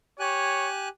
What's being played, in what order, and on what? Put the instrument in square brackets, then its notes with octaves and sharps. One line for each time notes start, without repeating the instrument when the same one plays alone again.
[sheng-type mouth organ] G4 G#5 F#6 [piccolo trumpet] C#5